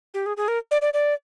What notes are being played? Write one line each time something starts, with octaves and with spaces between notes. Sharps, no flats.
G4
G#4
G#4
A#4
D5
D5
D5